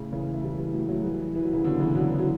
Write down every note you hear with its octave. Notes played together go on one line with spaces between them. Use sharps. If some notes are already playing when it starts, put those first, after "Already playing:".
Already playing: A2 C#3
C#3 E3
A3
E3 G3
E3 G3
F#3 A3
F#3 A3
E3 G3
E3
F#3
C#3 E3
B2 D3
C#3 E3
D3 F#3
E3
F#3